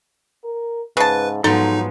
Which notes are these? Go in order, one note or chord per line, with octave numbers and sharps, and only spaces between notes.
A#4
G#2 C#3 B4 A5
G#2 F3 F#3 B3 D#4 A4